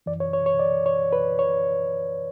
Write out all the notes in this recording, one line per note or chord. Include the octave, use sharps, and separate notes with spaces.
F#2 E3 D5
C#5
C#5
C#5
D5
C#5
B4
C#5